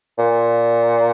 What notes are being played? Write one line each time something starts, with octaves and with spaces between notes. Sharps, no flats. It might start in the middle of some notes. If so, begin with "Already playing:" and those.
A#2